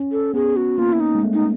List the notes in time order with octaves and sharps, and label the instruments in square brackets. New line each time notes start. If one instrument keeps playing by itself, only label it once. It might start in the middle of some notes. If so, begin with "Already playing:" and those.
Already playing: [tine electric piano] C#4
[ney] A4
[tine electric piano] B3 [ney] G#4
[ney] F#4
[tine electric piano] A#3 [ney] F4
[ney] E4
D#4
[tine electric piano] G#3
A3
[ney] D#4